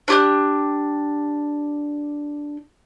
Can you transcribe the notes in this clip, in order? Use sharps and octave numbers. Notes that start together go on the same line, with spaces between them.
D4 G4 F#6